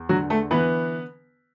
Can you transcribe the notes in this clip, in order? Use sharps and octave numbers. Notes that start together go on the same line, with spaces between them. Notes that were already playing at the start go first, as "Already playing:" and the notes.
Already playing: E2
D3 F#3 F#4
A3 A4
E3 B3 B4